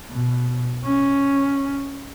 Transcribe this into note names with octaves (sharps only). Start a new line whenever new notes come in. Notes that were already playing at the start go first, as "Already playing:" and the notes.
B2
C#4